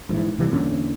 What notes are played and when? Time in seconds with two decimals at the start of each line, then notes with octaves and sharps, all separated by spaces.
0.09 A#1 G#2 E3
0.37 D2 C3 E3 G3
0.51 E2 A#2 D3 C#4